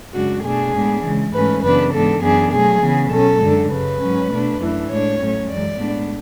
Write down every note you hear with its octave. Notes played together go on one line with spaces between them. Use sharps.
F#2 C#3 G#3 D4 F#4
B2 A3 D4 G#4
A2 G#3 B3 D4
C#3 E3 G#3
G#2 E3 A3 C#4 B4
F#2 C#3 E3 B3 D4 B4
G#2 E3 B3 D4 A4
F#2 E3 B3 D4 G#4
B2 F#3 A3 G#4
C#3 E3 B3
B2 F#3 C#4 A4
F#2 D3 G#3
F#2 C#3 F#3 B4
G#2 F#3 C#4
B2 A3 D4
F#2 E3 A3 D4
A2 G#3 D4 C#5
A2 F#3 A3 C#4
F#2 E3 G#3 D5
A2 G#3 B3 D4